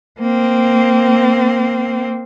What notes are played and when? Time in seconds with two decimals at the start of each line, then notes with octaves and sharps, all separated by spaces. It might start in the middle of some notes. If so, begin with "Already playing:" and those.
0.19 A#3 C4